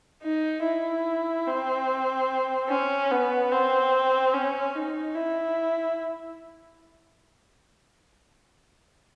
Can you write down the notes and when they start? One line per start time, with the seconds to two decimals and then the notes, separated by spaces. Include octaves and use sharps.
0.23 D#4
0.64 E4
1.47 C4
2.69 C#4
3.11 B3
3.52 C4
4.34 C#4
4.75 D#4
5.15 E4